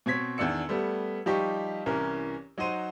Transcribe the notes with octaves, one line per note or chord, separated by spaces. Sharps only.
B2 C4 C#5 G#6 B6
E2 D#3 D4 D5 E6 C#7
G3 A3 B3
F3 G3 D#4 G4 D#5 C#6
C2 E3 C#4 A#4
F#3 D#4 F#4 C5 D#7